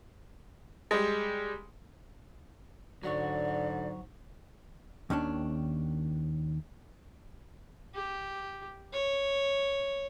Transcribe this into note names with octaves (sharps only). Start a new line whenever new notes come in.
G3 G#3
G#2 D3 F#3 F#4 C#5 D5
D#2 D#3 C#4 D4
G4
C#5